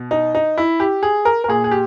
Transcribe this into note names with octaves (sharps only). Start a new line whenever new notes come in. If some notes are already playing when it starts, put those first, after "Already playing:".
Already playing: B2
D#4
D#4
E4
G4
G#4
A#4
A#4
A#2 G#4
G#4
G4